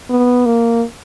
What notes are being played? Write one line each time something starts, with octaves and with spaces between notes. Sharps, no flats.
B3
A#3